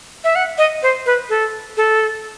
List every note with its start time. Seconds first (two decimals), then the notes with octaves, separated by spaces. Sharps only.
0.24 E5
0.35 F#5
0.58 D#5
0.83 C5
1.06 B4
1.30 A4
1.77 A4